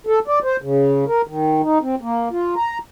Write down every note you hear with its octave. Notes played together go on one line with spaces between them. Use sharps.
A4
D5
C5
C#3
A#4
D#3
D#4
C4
A#3
F4
A#5